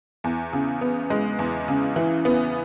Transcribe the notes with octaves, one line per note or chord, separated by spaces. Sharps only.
E2
C#3
B3
G#3
E2
C#3
E3
B3